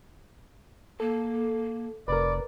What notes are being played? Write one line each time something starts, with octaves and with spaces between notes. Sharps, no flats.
A#3 A4
F1 A#4 B4 D5